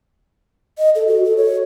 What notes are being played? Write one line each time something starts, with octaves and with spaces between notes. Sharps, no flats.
D#5
A4
F#4
A4
C#5